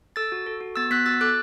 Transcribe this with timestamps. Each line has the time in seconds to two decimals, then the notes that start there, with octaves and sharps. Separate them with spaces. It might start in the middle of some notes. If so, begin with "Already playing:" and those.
0.16 A4 E6 A6
0.32 F#4
0.46 A4
0.61 F#4
0.76 B3 E6 A6
0.91 B3 F#6 B6
1.06 F#4 E6 A6
1.21 A4 D6 F#6